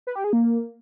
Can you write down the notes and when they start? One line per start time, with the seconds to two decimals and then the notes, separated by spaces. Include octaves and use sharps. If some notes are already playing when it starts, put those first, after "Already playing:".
0.07 B4
0.15 G4
0.24 G#4
0.33 A#3